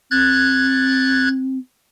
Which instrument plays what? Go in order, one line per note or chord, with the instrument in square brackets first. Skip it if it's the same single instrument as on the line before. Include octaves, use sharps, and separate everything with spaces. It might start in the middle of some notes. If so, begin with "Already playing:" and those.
[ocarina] C4 [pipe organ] F#6 G#6 A6